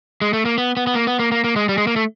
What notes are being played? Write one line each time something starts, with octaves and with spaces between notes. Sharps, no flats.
G#3
A3
A#3
B3
B3
B3
A#3
B3
A#3
A#3
A#3
G#3
G3
G#3
A#3
A3